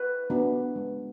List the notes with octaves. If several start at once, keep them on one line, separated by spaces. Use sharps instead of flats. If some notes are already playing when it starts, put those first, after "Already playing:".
Already playing: B4
B3 D4 F#4
G#3